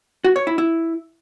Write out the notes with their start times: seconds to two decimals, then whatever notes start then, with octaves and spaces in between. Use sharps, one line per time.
0.24 F#4
0.36 C#5
0.47 E4
0.58 E4